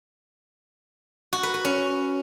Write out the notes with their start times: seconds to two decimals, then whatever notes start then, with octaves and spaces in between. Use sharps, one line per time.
1.33 F#4
1.43 B4
1.54 B4
1.65 C#4